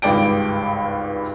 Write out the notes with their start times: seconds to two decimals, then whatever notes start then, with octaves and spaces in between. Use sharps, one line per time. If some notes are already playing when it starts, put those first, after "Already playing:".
0.02 G#1 C#2 G2 D5 G5 D7